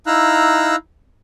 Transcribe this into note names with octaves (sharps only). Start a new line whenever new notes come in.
D#4 E4 F5 A#5 E6 F#6